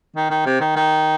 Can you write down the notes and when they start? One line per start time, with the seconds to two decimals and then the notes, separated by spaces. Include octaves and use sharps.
0.16 D#3
0.31 D#3
0.46 C3
0.61 D#3
0.76 D#3